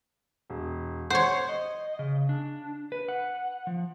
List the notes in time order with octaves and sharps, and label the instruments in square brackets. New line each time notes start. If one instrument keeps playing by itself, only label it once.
[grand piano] E1
[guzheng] C5 C#5 [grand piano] F#5
[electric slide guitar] D#5
C#3
D4
B4
F#5
F3